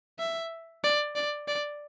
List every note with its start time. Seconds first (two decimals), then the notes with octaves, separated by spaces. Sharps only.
0.19 E5
0.84 D5
1.16 D5
1.48 D5